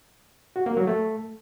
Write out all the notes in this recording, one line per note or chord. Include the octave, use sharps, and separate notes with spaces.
F#4
A#3
F#3
A3